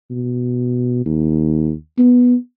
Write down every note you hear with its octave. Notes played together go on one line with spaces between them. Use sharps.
B2
D#2
B3